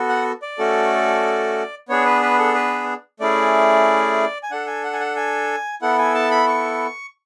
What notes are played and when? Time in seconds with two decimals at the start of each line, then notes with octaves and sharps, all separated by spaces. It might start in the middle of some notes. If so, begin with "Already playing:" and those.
Already playing: B3 F#4 A4
0.09 F#5
0.42 D5
0.58 A3 C#4 F#4 A4
1.89 B3 D4 G#4 C#5
2.05 B4
2.22 B4
2.38 A4
2.54 B4
3.20 A3 C#4 E4 G#4 D5
4.43 G#5
4.51 D4 A4 F#5
4.67 G#5
4.84 F#5
4.93 G#5
5.00 F#5
5.16 G#5
5.82 B3 E4 A4 F#5
5.98 G#5
6.15 A5
6.31 B5
6.47 C#6